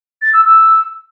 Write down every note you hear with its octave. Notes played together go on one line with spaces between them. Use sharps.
A6
E6
E6